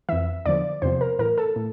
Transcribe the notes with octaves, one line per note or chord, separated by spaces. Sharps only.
F2 E3 E5
E2 D3 F3 D5
E2 C3 F3 C5
A#4
A2 E3 A#4
A4
A2